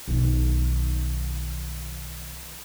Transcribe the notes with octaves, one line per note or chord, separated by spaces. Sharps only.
B1 D#3